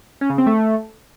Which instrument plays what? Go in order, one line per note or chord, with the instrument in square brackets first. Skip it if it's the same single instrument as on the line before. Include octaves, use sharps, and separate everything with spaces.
[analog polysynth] C#4
C#3
C4
A3